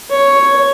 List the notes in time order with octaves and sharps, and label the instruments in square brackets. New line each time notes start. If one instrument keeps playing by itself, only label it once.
[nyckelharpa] C#5